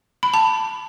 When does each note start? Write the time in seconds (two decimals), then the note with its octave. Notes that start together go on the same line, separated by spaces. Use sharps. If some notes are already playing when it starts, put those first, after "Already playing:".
0.23 B5
0.34 A5